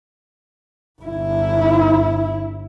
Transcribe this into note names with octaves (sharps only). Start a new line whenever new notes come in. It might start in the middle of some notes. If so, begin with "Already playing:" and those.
G1 E4